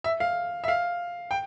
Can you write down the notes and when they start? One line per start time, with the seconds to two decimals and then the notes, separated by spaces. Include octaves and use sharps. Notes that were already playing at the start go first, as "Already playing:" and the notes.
0.04 E5
0.20 F5
0.64 E5
0.68 F5
1.31 G5